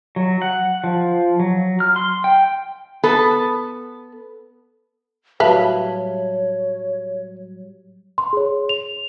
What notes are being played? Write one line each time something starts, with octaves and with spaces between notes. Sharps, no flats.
F#3
F#5
F3
F#3
F6
C6
G5
B3 A4
A2 F#3 G3 B4 C#5 E5 F5 A5
C6
G#4 C#5
F7